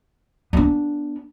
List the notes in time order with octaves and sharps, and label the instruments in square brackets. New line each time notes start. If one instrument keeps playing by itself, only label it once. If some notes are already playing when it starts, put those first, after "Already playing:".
[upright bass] B3 D4